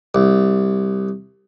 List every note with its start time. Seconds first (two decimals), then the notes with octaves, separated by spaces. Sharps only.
0.15 C2